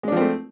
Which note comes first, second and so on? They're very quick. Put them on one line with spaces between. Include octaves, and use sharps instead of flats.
G#3 D4 F3 C4 A3